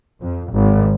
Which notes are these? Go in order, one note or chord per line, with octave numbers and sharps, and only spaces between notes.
F2
G#1